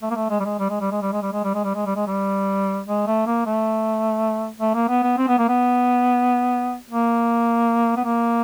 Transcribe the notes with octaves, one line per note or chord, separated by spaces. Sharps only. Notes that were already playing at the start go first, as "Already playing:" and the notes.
A3
A#3
A3
G#3
G3
G#3
G3
G#3
G3
G#3
G3
G#3
G3
G#3
G3
G#3
G3
G#3
G3
G#3
G3
G#3
A3
A#3
A3
A3
A#3
B3
B3
C4
B3
A#3
B3
A#3
B3
A#3